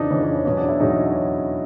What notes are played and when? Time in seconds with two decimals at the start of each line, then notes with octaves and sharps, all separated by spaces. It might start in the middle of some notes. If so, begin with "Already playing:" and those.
Already playing: F2 C#3 E3 D4 D#4
0.11 F2 C#3 E3 C#4
0.22 C#4
0.45 E2 B2 F#3 C#4
0.57 D4
0.68 E4
0.80 E2 B2 F#3 D#4
0.92 C#4